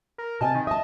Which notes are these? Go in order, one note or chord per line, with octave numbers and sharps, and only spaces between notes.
A#4
C3 D#5 G#5 A5
D#3
D#5 E5 A5